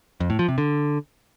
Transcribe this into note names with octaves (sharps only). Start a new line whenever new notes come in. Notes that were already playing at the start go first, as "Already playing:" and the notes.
F2
A2
F3
C3
D3